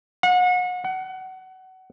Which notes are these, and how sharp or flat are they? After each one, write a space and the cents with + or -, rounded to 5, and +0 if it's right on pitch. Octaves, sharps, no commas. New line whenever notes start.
F#5 -35
F#5 +25